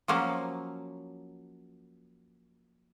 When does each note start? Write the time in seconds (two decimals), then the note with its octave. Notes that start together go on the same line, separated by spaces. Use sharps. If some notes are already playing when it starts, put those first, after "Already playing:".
0.08 F3 F#3 A#3 C#4